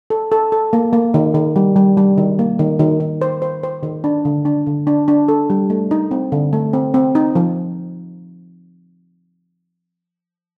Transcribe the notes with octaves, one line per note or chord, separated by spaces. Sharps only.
A4
A4
A4
A#3
A#3
D#3
D#3
G3
G3
G3
D#3
A#3
D#3
D#3
D#3
C5
C5
C5
D#3
D4
D3
D4
D3
D4
D4
A4
G3
A3
D#4
C4
D3
A3
C4
C4
D#4
F3